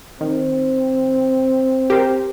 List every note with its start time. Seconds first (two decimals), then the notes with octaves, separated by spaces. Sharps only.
0.21 D#3 C4
1.90 G4 A#4 C5